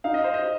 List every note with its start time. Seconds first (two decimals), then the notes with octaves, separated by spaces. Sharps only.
0.04 D#4 F5
0.14 D#5
0.24 C5
0.34 D#5